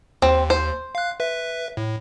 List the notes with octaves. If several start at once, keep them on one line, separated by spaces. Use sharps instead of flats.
D#2 C4
C5
F5 F#6
B4 E5
A2